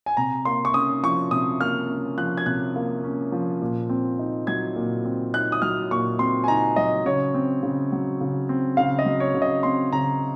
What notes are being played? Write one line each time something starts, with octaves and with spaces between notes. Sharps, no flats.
G#5
C3 A#5
A#3 C6
C#6
C#4 D#6
F3 C#6
C3 D#6
A#3 F6
C#4
F3 F#6
G#6
C3 F#6
A#3
C#4
F3
A#2
C4
D#4
F#3 G#6
A#2
C4
D#4 F#6
D#6
F#3 F6
A#2 C#6
C4 C6
G#5
D#4 A#5
F#3 D#5
C#3 C#5
C4
C#3
F#3
C#3
C4
C#3 F5
D#5
F#3
C#5
C#3
D#5
C4 C6
C#3 A#5